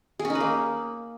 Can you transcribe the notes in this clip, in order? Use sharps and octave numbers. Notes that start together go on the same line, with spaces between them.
G#4
C#4
D#4
B4
A#3